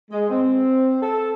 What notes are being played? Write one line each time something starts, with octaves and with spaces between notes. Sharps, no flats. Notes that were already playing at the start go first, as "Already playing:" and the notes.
G#3
C4
A4